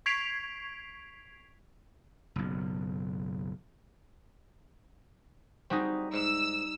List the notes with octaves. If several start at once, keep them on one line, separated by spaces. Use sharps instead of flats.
C#6 G#6 B6 C7 D7 F7
F#1 B1
G3 C4 D#4 F#4 G#4
G#2 E6